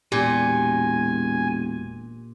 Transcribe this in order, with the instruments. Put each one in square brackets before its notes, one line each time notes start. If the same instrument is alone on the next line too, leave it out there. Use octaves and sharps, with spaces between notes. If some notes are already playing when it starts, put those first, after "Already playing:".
[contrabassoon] E1 [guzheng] A#2 [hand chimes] G4 [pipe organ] G#5